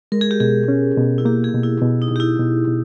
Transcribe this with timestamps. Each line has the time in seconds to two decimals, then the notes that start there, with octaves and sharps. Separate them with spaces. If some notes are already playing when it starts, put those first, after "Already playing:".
0.12 G#3 A#4
0.21 G#4
0.31 G4
0.40 B2 G#4
0.68 C#4
0.97 B2
1.18 E4
1.25 A#3 G4
1.44 G#4
1.54 B2
1.63 E4
1.82 B2
2.02 D#4
2.11 B2 G4
2.20 E4
2.39 B2
2.68 B2